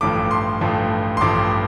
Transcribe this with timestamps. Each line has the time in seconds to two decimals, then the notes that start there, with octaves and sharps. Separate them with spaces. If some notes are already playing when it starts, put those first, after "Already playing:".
0.01 A1 G2 F3 A3 D6
0.31 C6
0.61 A1 G2 F3 A3
1.17 C6
1.21 A1 G2 F3 A3 D6